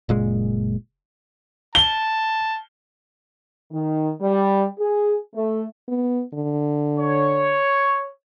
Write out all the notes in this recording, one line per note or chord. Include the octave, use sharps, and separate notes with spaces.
F#1 A#2 G#3
A5 G7
D#3
G3
G#4
A3
B3
D3
C#5